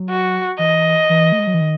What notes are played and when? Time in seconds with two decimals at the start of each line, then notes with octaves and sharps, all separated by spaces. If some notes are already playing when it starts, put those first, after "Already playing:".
Already playing: F#3
0.09 F#4
0.59 E3 D#5
1.09 E3
1.32 A3
1.39 G#3
1.47 F#3
1.54 E3
1.61 D#3